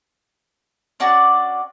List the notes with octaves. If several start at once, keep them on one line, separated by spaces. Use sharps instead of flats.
C#4 D4 F#4 D5